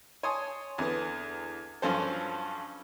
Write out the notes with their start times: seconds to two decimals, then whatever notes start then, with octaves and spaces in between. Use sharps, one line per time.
0.23 C#5 G#5 A5 C6 D#6
0.78 E2 D3 B3
1.82 G2 F3 F#3 C#4 A4 C5